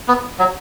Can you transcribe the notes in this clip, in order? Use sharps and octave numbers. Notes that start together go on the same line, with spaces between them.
B3
F#3